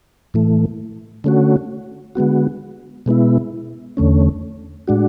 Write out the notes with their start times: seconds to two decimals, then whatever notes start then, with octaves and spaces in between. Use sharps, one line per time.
0.34 A2 E3 A3
1.24 D3 A3 C#4 F#4
2.15 D3 G#3 B3 F#4
3.06 B2 G#3 B3 E4
3.97 E2 D3 A3 C#4
4.88 A2 G#3 D4 F#4